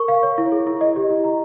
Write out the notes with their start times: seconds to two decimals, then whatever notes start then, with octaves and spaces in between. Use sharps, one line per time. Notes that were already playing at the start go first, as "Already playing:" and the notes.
Already playing: A#4 C#6
0.08 F5
0.23 C#5
0.38 E4
0.52 G#4
0.67 E4
0.81 D#5
0.96 G4
1.10 E4
1.24 A#5